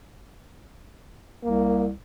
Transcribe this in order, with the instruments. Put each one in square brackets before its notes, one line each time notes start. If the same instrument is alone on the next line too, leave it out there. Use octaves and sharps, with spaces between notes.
[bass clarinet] C2 [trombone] A#3